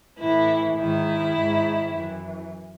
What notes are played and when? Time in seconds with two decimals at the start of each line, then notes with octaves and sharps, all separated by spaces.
0.18 A2 E3 E4
0.76 G#2 D#3 E4
1.34 G#2 D#3
1.92 F#2 E3